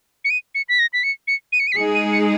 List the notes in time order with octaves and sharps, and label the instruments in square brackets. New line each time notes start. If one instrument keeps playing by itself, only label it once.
[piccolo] C#7
D#7
C#7
B6
A#6
B6
C#7
C#7
D#7
C#7
D#7
B6
[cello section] G#3 D#4 G#4 [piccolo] C#7
[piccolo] D#7
C#7